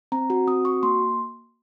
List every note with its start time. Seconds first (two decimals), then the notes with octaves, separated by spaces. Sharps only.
0.12 C4 A#5
0.30 F#4
0.47 C4 D#6
0.65 F#4 C#6
0.83 A#3 C6